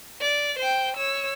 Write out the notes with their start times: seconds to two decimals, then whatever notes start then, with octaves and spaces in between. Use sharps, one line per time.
0.21 D5
0.59 C5 G5
0.97 C#5 E6